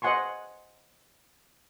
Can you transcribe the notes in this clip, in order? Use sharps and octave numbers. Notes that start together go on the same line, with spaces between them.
C5 D#5 F#5 G#5 C6 C#6